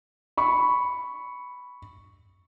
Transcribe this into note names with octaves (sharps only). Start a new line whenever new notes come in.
B5 C#6